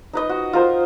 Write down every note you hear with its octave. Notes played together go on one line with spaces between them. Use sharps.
D#4 B4 D#5
F#4
F4 A#4 C5